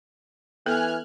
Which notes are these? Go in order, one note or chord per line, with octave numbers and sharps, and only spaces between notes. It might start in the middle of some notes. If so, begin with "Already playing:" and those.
E3 B3 A4 G#5 F6 F#6